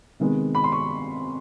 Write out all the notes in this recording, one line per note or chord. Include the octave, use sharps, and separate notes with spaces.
C3 D#3 G#3 B3
B5
C6
C#6